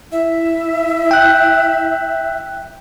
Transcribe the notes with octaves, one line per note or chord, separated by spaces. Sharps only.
E4 E5
G5 F#6